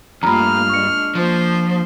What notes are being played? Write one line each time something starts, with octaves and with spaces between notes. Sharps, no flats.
E2 G2 A3 A#3 F4 A#5 B5 F6
G#3 D4 C#6 C#7
F3 A#3 D4 C5